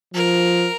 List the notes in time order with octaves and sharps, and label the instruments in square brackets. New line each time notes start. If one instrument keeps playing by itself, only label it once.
[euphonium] F3 [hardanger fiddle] A#4